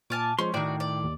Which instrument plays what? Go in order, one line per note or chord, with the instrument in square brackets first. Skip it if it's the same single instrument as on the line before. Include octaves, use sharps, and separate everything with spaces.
[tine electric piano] A#2 F6 [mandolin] G#5 A5 D6
[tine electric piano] F3 G#3 C5 [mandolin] C#4 [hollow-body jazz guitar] C6
[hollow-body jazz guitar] A2 D#3 [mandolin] F#4 D5 [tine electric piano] G5
[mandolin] D5
[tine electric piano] D#2